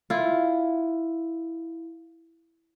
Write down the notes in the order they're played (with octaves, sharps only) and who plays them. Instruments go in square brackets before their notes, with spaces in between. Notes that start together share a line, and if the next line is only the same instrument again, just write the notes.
[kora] E4 F4